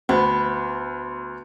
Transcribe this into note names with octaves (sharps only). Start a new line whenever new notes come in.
D2 B3